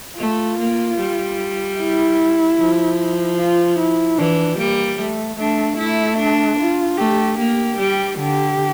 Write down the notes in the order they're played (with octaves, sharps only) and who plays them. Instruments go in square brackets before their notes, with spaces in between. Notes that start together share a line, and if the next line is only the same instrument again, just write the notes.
[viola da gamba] A3 [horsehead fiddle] F4
[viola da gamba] A#3
G3
[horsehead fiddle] E4
[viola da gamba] F3
[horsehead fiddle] F4
E4
[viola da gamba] E3 [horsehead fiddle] D4
[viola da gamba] G3 [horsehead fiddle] A#3
[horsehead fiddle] A3
[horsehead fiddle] A3 [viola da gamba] D4
[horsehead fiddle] A3 [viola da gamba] E4
[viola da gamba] D4
[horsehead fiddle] F4
[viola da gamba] A3 [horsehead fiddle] G4
[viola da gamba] A#3 [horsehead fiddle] G4
[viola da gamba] G3
[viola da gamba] D3 [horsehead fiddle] G4